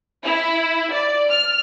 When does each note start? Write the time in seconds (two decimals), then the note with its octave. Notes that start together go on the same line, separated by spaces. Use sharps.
0.25 E4
0.93 D5
1.30 F6